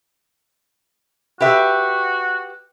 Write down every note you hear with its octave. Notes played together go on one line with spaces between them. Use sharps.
F#4 G4 B4 E5